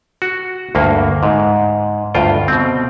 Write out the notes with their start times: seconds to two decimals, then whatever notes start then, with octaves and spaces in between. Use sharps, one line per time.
0.22 F#4
0.75 D2 G2 A#3
1.23 G#2
2.14 D2 G2 F4 G5
2.48 B2 C4